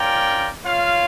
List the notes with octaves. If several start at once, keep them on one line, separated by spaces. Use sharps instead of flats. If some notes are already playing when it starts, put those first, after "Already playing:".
Already playing: C#4 F4 A#4 D5 G5
F4 C#5 F5